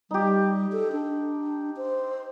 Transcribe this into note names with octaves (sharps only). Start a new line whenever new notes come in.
G3 D#4 G4
A4
D4
C5